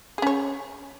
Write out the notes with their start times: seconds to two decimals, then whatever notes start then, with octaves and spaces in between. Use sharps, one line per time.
0.18 G#4
0.22 C#4
0.27 C#5